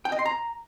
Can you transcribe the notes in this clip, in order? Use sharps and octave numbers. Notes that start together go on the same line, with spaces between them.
G5
D#5
C6
A#5